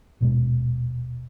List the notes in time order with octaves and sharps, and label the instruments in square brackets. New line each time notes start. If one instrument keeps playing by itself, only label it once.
[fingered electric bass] D#1 G#2 B2 G#3